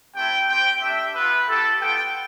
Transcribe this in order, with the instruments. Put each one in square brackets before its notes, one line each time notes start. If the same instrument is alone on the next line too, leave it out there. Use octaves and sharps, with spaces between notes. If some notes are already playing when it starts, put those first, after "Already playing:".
[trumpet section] A3 C4 E4 G4 G5
C4 G4 G5
A3 D4 G4 E5
B3 F4 B4
A3 E4 G4 A4
B3 F4 G5